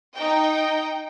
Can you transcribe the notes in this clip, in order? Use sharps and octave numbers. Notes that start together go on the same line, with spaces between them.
D#4 G5